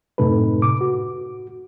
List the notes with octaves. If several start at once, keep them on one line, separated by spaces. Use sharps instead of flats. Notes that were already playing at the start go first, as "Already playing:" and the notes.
F#2 A2 C3 D#4 A4 B4
D6
F#4